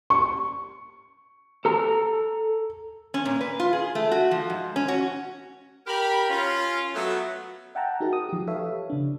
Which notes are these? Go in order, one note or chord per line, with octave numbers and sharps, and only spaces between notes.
C#6
A4 A#5
C#4
A#2
B4
F4
G#4
A3
F#4
F3
G#2
C#4
F#4
G4 A#4 B5
C#4 F4
F#3 A3 B3
E5 F#5 G5 A5 A#5
D#4 F#4 G#4 A#4
D#6
F3 G4
G4 A4 B4 C#5 E5 F5
C#3 D4